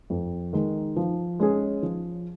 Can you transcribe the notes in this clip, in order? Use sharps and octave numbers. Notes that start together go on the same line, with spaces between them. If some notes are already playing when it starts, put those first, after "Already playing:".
F2
D#3 G#3 D#4
F3
G#3 C#4 G#4
F3